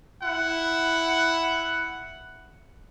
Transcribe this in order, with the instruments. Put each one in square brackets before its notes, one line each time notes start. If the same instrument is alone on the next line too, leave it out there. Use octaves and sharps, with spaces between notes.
[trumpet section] E4 F#5